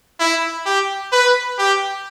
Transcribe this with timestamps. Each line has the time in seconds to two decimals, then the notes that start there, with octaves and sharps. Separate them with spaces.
0.20 E4
0.66 G4
1.12 B4
1.59 G4